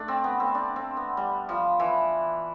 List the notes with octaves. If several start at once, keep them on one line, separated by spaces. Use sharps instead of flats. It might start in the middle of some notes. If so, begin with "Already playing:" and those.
Already playing: A3 D4
C4
B3
C4
D4
C4
B3
G3
F3
E3